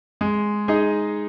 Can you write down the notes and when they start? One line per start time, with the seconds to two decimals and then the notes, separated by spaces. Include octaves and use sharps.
0.21 G#3
0.68 D#4 G#4 D#5